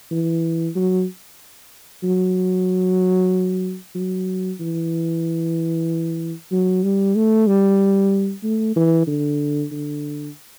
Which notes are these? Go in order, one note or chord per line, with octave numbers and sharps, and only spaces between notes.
E3
F#3
F#3
F#3
E3
F#3
G3
A3
G3
A3
E3
D3
D3